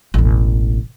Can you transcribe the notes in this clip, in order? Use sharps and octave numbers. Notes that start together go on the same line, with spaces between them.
E1 A1